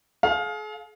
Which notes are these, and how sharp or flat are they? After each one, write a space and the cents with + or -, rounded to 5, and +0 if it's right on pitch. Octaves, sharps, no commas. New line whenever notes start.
G#4 +45 F5 +20